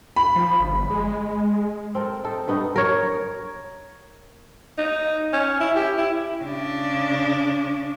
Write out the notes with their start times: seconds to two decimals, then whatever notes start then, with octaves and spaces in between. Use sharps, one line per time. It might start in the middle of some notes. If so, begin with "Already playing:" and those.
0.16 B5
0.35 F3
0.60 G1
0.90 G#3
1.95 C4 A4 A#4
2.24 D#4 A4 C5
2.48 G2 B3 D#4
2.76 A#4 C#5
4.78 D#4
5.33 C#4
5.60 E4
5.76 G4
5.98 E4
6.43 C#3 D4